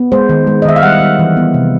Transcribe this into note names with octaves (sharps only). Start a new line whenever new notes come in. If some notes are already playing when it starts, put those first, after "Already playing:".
Already playing: B3
G#3 C5
D#3
G#3
D#5
D#3 E5
F5
G3 F#5
G3
E3
B3
C3